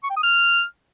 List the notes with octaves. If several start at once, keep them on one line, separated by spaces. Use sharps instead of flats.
C#6
G5
D#6
F6